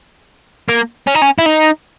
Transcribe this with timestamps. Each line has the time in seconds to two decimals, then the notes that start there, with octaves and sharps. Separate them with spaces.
0.68 A#3
1.07 C#4
1.15 D#4
1.22 C#4
1.39 E4
1.46 D#4